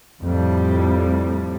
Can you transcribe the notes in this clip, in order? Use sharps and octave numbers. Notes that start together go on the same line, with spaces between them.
F2 A2 G3